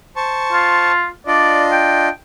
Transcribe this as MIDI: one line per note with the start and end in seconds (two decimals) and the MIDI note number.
0.16 0.92 72
0.16 0.92 81
0.16 0.92 85
0.53 1.07 65
1.27 2.09 62
1.27 2.09 65
1.27 1.63 74
1.27 2.09 75
1.72 2.10 79